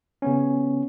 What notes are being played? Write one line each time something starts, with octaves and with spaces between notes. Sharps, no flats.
C#3 B3 C#4